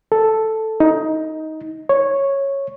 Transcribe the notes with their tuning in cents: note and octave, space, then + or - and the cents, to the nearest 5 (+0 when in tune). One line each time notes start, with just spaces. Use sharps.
A4 +0
D#4 +15
C#5 -5